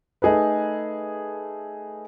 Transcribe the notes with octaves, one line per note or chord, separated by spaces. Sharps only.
A3 D#4 G#4 A4 B4